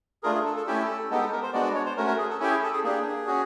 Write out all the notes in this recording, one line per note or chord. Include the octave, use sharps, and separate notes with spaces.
A3 D4 F4 G#4 A#4
G#4
A4
A4
A3 C#4 E4 G4 A4
G#3 B3 D#4 G4 A4
A4
A#4
C5
G#3 B3 D4 F#4 D5
D5
C#5
C5
A3 C#4 F#4 A#4
A#4
G#4
A4
C#4 E4 G4
G#4
A4
G#4
A#3 D4 G4 G#4
C#4 F#4